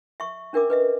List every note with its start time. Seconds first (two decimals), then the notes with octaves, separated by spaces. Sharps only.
0.20 E5 C#6
0.53 C#4 D4 A#4 E5 D6
0.70 B4 D#5 E5